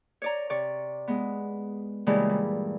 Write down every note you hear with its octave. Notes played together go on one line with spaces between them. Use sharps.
C#5 D5 A#5
C3 D5 C#6
G#3 B3
G2 A#2 C#3 E3 G3 G#3
G3